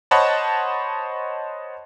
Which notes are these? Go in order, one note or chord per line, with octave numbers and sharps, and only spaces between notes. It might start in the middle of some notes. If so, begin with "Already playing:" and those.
C5 C#5 D#5 F#5 A5 B5